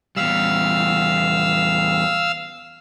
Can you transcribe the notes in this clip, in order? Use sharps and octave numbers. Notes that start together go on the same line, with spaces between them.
E2 G3 F5 E6